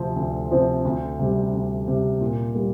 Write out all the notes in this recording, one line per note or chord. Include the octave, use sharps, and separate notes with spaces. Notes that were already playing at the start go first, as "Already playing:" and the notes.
Already playing: D2 C3 F3 C4
D2
C3 F3 C4
D2
C3 G3
D2
C3 G3
A#2
G3 A#3